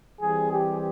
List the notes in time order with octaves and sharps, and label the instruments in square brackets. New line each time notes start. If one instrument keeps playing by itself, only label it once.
[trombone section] E3 G3 C4 G#4
G4